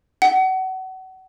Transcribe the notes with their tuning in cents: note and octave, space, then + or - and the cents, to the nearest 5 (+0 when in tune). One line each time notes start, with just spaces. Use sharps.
F#5 +30